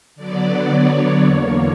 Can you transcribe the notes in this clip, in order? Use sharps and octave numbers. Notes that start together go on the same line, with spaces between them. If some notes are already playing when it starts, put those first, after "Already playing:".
D3 F#3 B3 D5
C#5
E2 D3 A#3